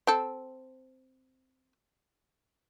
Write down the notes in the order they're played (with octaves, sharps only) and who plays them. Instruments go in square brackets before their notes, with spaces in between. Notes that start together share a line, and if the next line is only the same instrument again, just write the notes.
[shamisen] C4 A4